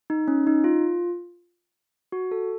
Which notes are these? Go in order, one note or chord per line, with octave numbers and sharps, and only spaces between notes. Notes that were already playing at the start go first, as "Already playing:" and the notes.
D#4
C#4
D#4
F4
F#4
A4